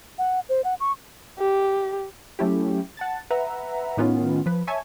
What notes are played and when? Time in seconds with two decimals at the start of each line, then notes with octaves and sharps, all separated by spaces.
0.18 F#5
0.49 C5
0.64 F#5
0.80 C#6
1.39 G4
2.39 F#3 A3 C#4 E4 G4
2.97 F#5 A5 A6
3.31 B4 E5 F#5 A#5
3.97 A2 D#3 B3 C#4 F4
4.46 F3 B4
4.67 C#5 E5 G#5 A5 C#6 G#6